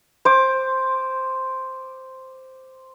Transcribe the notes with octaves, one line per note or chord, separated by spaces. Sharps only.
C5 D6